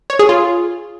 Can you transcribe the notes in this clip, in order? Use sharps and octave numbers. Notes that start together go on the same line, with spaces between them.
C#5
G#4
F4